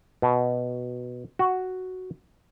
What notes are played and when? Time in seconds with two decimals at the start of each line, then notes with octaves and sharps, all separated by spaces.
0.22 B2
1.39 F#4